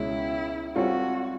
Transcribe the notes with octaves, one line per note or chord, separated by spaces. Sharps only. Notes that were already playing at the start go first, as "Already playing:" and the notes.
Already playing: C#2 B2 G#3 C#4 E4
G3 C4 F4 F#4 A4 C#5